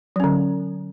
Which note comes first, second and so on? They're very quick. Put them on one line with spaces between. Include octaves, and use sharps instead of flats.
F#3 C#4 D3